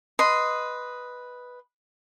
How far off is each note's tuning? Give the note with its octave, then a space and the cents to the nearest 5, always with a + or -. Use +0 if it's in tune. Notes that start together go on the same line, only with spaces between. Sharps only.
B4 +0 D#5 +0 C6 -10